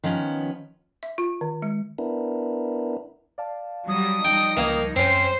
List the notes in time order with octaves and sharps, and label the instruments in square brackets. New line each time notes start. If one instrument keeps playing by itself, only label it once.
[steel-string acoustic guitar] D#3 F3 B3 C#4
[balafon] E5
F4
D#3
G#3
[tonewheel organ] B3 D4 E4 A#4
[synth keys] D5 F5 A5
[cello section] F#3 G3 [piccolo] D#6
[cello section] F3 G3 D#4 [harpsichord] G5
[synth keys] C#2 G#6 [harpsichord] D#3 A#3
[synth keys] F#2 [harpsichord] C4 C#4 [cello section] C5 [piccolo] C7